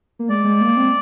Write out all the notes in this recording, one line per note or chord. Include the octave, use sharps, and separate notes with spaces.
A#3
G#3 D5
G#3
A#3
C4